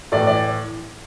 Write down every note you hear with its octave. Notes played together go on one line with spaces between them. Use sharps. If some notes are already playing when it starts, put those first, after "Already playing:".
A2 E3 D5
D5